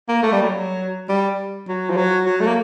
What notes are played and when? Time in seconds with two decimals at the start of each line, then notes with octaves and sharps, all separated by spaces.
0.09 A#3
0.23 A3
0.32 G3
0.42 F#3
1.09 G3
1.68 F#3
1.90 F3
1.96 F#3
2.26 F#3
2.40 A3
2.47 A#3